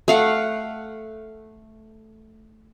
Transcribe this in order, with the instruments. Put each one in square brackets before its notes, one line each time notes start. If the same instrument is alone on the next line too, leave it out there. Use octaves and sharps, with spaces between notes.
[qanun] A3 F5 F#5